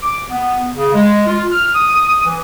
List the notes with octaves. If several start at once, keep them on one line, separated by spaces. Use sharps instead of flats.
D6
B3
C#3
G#3
F4
F6
D#6
E3